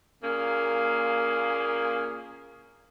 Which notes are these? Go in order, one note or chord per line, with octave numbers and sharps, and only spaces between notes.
A#2 A#3 C#4 G#4